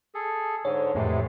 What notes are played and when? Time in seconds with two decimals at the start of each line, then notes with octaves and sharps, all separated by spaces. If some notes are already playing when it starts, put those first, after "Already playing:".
0.15 G#4 A4
0.65 G#2 D3 C#5
0.95 F2 A2 C3 E3 G#3